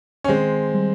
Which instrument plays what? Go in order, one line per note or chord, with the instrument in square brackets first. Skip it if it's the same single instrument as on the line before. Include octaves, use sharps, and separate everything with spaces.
[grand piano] C#4
[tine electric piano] D#3 [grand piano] G#3 C4
[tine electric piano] G3